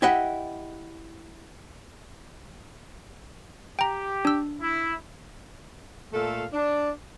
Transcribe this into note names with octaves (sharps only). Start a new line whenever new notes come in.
E4 G4 D#5 E5 F#5
G4 G5 A#5
D4 E6
E4
A#2 A3 A4 F5
D4